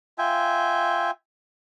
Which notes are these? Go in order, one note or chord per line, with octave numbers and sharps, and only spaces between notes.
F4 E5 G5 G#5